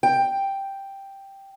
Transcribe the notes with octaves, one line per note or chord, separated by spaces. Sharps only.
G5